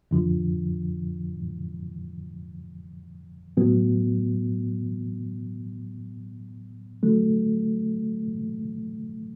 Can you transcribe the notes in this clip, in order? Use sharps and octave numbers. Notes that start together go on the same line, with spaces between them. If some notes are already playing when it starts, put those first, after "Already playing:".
F2 D3 F3
A2 F#3 B3
D3 F#3 A3